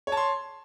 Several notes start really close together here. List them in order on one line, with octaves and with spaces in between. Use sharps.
C#5 A5 C6